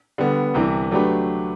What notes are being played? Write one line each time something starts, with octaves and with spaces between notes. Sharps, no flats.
D3 G3 B3
C2 C3 E3
F#3 A3 D4 G4 B4